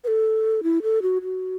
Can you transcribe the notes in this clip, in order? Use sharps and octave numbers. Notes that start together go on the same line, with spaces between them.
B4
A4
E4
A4
F#4
F#4